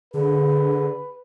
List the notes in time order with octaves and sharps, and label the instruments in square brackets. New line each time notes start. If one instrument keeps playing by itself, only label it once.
[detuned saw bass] D3 [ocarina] G#4 [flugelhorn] B4